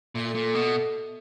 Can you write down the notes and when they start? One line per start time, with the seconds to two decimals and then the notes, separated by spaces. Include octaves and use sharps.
0.15 A#2 A3
0.35 A#2
0.55 B2